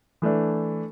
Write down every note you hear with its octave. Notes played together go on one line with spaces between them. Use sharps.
E3 A3 D4